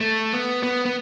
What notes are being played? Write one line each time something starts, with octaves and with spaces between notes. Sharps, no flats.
A3
B3
B3
B3